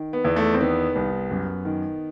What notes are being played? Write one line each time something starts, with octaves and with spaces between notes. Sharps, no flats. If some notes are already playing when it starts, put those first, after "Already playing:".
Already playing: D#3
B3
E2
A3
C4
D#3 B3
C2
F#2
D#3